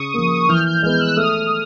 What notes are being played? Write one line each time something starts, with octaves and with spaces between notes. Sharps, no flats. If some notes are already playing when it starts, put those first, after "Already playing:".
Already playing: C#3 C#6 D#6
F3 A#3
E3 F6 G6
F6 G6
G#3 B3 F6 G6
E6 F#6
A3 D#6 F6